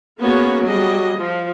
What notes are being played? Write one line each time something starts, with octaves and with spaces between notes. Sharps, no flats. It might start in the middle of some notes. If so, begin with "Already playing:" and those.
A#3 B3 C#4 F#4 G#4 C#5
F#3 G3 G#4 D#5
F3